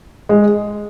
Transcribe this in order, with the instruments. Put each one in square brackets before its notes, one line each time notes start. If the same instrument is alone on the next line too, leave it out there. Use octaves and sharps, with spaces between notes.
[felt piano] G#3